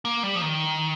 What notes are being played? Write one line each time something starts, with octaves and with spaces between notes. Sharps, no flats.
A#3
G3
F3
D#3